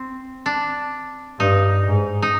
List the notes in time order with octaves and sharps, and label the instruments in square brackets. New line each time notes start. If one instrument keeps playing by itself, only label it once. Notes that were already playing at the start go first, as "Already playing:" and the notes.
Already playing: [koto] C4
D4
[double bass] G2 [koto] D#4
[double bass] G#2
[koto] D#4